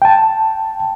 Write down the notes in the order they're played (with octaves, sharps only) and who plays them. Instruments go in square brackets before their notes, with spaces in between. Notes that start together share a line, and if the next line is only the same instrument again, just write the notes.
[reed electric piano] G5 A5